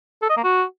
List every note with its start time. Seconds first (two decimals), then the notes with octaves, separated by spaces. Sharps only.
0.23 A4
0.30 D#5
0.37 A#3
0.44 F#4